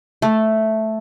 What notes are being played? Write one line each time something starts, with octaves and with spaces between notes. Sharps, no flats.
A3